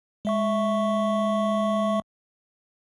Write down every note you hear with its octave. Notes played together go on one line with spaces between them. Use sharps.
G#3 E5 C#6